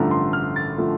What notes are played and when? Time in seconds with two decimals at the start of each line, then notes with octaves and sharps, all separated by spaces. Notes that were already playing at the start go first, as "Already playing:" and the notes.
Already playing: A1 G2 D3 F3 A3 A#5
0.11 C6
0.33 F6
0.56 A6
0.78 D3 F3 A3